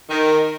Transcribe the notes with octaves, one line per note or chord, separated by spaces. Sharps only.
D#3